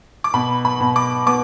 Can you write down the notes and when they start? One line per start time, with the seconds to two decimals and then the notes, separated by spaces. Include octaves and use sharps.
0.24 D6
0.34 B2 B5
0.65 B5
0.81 B2
0.96 D6
1.26 B3 D6